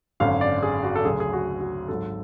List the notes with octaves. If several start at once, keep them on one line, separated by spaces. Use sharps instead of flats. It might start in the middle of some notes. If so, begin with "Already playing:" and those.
G#1 F#2 D3 F5
D5
G#4
F#4
A4
D2 C#3 F#3 G#4
G#4
F#4
F#4
G#1 G#2 F#3 A4